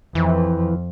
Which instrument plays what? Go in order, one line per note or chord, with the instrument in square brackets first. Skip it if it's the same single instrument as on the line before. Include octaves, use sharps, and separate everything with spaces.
[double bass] F2 [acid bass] E3